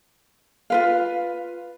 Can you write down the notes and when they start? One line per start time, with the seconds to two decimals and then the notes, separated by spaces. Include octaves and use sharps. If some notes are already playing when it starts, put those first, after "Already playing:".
0.70 F4 B4 F5